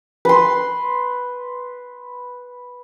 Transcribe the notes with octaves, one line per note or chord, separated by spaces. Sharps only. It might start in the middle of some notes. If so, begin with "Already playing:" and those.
B4 C6